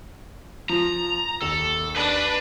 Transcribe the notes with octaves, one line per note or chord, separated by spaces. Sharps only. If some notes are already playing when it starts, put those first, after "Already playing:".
F3 A#5
D#2 A4
D4 B4 B5